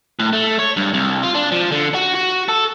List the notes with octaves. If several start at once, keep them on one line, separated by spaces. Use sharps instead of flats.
A2
A3
C#5
G2
C2
F4
D4
F3
D3
F#4
F#4
A4